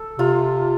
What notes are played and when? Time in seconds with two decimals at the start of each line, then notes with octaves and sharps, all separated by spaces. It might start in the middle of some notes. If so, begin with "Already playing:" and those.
Already playing: A4
0.19 C3 F4